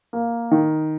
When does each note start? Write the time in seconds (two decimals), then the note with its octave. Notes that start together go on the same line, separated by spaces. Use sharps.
0.13 A#3
0.51 D#3